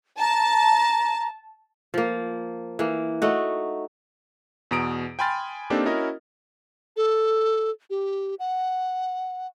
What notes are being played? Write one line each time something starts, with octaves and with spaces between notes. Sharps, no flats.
A5 A#5
F3 A#3
E3 A#3
A3 D#4 F#4
E2 B2 A#5 D#6 D7
G5 G#5 B5 C6 F6 A6
A#3 C4 D4 D#4 G4 A4
C#4 E4 F#4 A#4 D#5
A4
G4
F#5